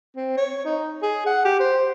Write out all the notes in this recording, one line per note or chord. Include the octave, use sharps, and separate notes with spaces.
C4
C#5
D#4
G#4
F#5
G4
C5